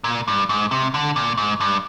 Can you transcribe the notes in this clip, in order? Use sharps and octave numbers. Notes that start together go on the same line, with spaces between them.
A#2
G2
G#2
C3
D3
A#2
G#2
G2